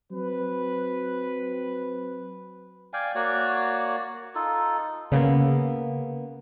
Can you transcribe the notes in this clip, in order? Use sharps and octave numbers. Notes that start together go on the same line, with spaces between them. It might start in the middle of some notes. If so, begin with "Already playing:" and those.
F#3 C4 B4
D5 F5 G5 G#5
A#3 F#4 C#5 D5
D#4 F4 A4
C#3 A#3 B3